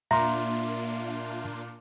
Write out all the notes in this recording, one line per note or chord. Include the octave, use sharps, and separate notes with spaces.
A#2 A#3 D4 F4 E5 A#5 C6